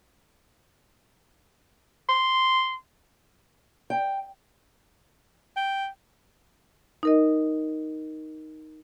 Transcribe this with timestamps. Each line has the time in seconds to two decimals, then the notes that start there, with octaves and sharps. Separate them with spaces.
2.09 C6
3.90 G5
5.56 G5
7.03 D#4 A#4 D#5